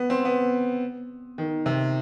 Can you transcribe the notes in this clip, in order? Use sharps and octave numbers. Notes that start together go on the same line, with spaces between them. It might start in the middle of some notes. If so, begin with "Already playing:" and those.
Already playing: B3
C4
B3
D#3
C3